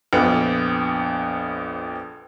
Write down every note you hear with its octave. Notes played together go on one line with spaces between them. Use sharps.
A#1 F2 B3